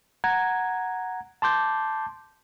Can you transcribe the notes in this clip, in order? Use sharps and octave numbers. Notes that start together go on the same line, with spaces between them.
F#5 A#5 G#6
A5 C6 D6 G6